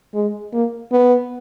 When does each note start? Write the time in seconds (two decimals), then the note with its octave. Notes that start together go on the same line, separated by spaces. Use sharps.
0.14 G#3
0.53 A#3
0.92 B3